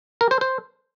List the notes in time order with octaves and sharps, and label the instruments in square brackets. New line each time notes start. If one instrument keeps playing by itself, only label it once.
[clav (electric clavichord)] A#4
C5
C5